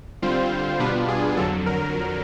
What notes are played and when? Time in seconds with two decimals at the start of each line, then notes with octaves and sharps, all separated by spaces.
0.22 D3 G3 C4 F4 C5
0.80 B2 G3 B3 D4 F4 B4
1.09 G#4
1.37 F2 D3 F#3 A4
1.66 A#4